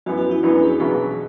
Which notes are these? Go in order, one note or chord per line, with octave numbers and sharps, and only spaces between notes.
F#2 E3 B3 F#4
F#4
E4
F#2 E3 B3 D4
D4
G#4
F#4
E2 B2 F#3 G#4